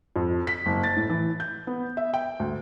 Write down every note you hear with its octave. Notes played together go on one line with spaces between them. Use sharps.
F2
B6
F#1
A6
A2
E3
G6
B3
E5
G5
D2